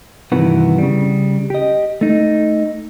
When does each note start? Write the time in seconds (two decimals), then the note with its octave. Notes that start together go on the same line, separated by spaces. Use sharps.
0.32 G2 C3 D#3 E3 B3 F#4
0.78 C#3 G3
1.50 G4 D#5
2.01 A3 D#4